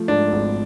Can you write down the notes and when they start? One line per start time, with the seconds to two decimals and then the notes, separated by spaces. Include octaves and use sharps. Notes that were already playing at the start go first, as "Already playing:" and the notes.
Already playing: F3 A3
0.08 G#2 D4
0.32 G#1